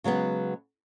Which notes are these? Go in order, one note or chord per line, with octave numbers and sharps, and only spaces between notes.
C#3 F#3 G#3 B3